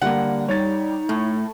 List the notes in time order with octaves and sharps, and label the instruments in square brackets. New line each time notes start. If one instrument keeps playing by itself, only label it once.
[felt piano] D3 G3 A#3 [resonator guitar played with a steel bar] F#5
[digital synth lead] G3 [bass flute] D#4 [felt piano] C#5 A6
[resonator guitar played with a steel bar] A2 [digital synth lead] A3